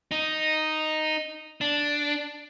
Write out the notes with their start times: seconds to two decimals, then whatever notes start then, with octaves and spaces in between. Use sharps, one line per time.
0.11 D#4
1.61 D4